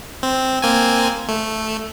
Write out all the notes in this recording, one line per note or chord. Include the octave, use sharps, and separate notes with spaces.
C4
A#3 C4 G#5
A3